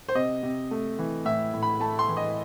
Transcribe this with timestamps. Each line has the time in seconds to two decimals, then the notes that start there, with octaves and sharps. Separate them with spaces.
0.08 C5
0.15 C3 D#5
0.43 C3
0.71 A3
0.99 E3
1.25 A2 E5
1.54 A2
1.63 B5
1.80 A3 A5
1.99 C6
2.08 E3
2.17 D#5